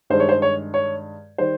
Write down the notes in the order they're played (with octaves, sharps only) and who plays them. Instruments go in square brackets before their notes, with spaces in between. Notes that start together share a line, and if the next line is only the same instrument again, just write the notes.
[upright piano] G2 D#3 G#3 C5
C#5
C5
C#5
C#5
D#3 G3 C5